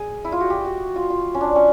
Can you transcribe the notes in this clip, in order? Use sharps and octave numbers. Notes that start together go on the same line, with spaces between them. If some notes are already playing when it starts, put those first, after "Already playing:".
Already playing: G#4
E4
F4
F#4
G4
F#4
F4
F4
C#4
D4
C#4